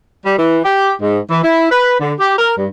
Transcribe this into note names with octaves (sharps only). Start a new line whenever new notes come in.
G3
E3
G4
G#2
E3
E4
B4
D3
G4
A#4
G2